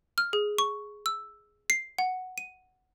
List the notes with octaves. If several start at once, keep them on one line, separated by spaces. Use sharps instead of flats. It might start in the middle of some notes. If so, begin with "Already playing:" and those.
F6
G#4
C#6
E6
C7
F#5
D#7